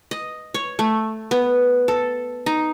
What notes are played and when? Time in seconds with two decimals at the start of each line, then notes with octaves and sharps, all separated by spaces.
0.11 D#5
0.54 C#5
0.79 A3
1.31 B3
1.88 A4
2.46 D#4